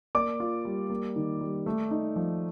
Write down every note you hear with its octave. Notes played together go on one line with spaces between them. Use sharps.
A#3 D5 D6
F4
G3
A#3
D#3
G3
A3
D#4
F3